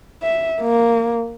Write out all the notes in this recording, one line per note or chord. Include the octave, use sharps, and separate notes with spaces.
E5
A#3